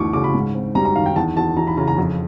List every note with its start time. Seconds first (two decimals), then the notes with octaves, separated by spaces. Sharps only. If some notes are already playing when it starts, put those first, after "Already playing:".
Already playing: D2 E3 A3 C#6 D6
0.13 C#3 D6
0.24 B5
0.34 G#2
0.55 C4
0.75 G3 A#5
0.85 A#5
0.96 D#3 F5
1.06 G5
1.16 E2 A5
1.37 E2 A5
1.57 E3 A#5
1.67 B5
1.77 C#3 A#5
1.87 A#5
1.98 F2